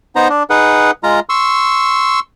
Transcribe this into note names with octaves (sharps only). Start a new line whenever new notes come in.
B3 D#4 C5 A#5
D4
D#4 G#4 B4 F#5
G#3 F4 A#5
C6 C#6 E6